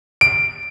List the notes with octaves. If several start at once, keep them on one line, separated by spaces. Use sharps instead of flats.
D7